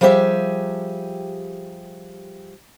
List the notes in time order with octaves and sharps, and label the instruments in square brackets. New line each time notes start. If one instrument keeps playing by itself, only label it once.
[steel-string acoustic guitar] F3 G3 G4 G#4 D5 E5